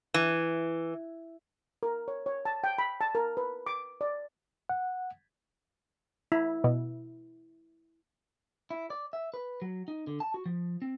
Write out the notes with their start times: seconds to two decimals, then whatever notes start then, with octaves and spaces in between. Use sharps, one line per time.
0.14 E3
1.83 A#4
2.08 C#5
2.26 C#5
2.45 A5
2.64 G5
2.78 B5
3.01 A5
3.15 A#4
3.37 B4
3.66 D6
4.01 D5
4.69 F#5
6.32 E4
6.64 B2
8.71 E4
8.90 D5
9.13 E5
9.34 B4
9.62 F#3
9.88 D#4
10.07 D3
10.20 A5
10.34 F#4
10.46 F3
10.82 C4